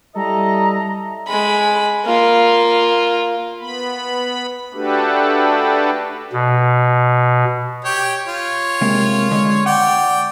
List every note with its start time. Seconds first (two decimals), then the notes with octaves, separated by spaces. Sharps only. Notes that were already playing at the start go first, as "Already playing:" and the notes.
0.16 G3 E4 A4 D#5 A#5
1.28 G#3 B5
2.05 A#3 F4
3.60 B3 B5
4.74 A3 D4 F#4 G4 A4 B4
6.33 B2
7.85 G4 C#5 G5
8.26 F4 C#5
8.81 C3 G#3 A#3
9.31 D3 G#3
9.66 D5 F#5 G5